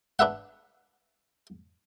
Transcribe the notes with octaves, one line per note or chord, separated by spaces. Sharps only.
D4 B4 E5 F#5